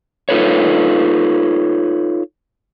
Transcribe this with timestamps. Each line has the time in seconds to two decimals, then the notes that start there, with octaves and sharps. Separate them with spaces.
0.29 D#4 F4 A4 B4 C#5